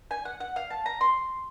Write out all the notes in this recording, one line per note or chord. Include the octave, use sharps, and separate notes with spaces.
G#5
F#5
F#5
F5
A5
A#5
C6